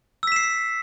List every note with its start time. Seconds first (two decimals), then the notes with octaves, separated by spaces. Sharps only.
0.23 E6
0.27 B6
0.32 E7
0.36 C7